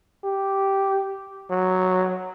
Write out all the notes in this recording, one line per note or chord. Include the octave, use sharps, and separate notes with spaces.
G4
F#3